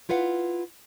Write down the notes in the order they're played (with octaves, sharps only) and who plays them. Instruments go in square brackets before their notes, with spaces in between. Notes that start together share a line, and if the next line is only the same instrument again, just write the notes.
[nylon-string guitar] E4 F4 B4 F5 F#5